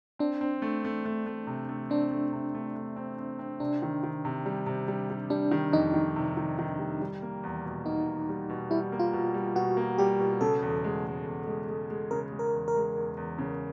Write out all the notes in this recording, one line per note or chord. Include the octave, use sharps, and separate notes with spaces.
C4 D4
C4
A3
A3
A3
A3
C3
A3
C4 D4
A3
C3
A3
A3
C4
C4
C4
C3 D4
D#3
D#3
C3
G3
C3
G3
G3
G3 D4
D#3
F2 D#4
D#3
C3
D#3
D#3
G3
G3
A#3
E2
B2
A#3 D#4
E2
G3
B2
G3 E4
A#3
F4
B2
G3
B2 F#4
A#3
G3 G4
B2
C#3 A4
E2
G#3
G#3
E2
G#3
G#3
G#3
C#3 A#4
G#3
A#4
E2
A#4
G#3
E2
E2
C#3